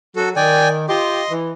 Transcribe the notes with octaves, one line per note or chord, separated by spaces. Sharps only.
F#3 F#4 A4
D#3 D5 G5 G#5
F4 G4 D#5 C6
E3